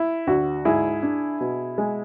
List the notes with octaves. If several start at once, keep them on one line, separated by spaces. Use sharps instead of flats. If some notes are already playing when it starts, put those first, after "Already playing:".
Already playing: E4
D2 F#4
G#2 E4 G#4
D4
B2
G#3